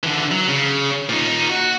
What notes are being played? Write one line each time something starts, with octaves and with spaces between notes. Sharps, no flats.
D3 E3
F#3
C#3
A#2 D#4
F#4